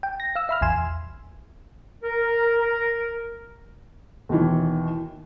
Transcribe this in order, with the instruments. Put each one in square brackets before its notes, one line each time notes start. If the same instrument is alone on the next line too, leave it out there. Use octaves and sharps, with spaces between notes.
[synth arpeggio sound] G5
A#6
F5 E6
E5 B5 F6
A#1 E2 G#5 C6 E7
[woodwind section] A#4
[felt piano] D#2 B2 D#3 E3